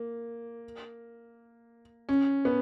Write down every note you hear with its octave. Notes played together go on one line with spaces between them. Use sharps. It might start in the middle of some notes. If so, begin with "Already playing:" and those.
Already playing: A#3
C#4
B3